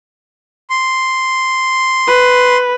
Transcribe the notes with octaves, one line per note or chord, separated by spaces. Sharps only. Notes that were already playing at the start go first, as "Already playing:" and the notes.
C6
B4